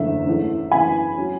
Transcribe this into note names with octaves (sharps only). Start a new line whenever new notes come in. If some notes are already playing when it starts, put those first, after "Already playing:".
Already playing: F#1 E2 D3 A3 E5
G#2 E3 A3 C#4
F#2 C#3 E3 B3 G#5 B5
F#3 C#4